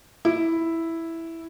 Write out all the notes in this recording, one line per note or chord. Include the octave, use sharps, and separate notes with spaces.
E4